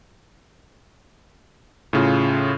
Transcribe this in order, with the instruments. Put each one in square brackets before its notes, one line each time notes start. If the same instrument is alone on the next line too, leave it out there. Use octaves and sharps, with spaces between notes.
[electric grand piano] A2 C#3 F4